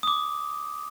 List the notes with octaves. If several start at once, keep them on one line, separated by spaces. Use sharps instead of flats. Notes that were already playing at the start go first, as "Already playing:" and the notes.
D6 D#6